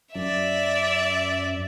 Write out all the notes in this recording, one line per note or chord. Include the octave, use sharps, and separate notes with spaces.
F#2 D5 E5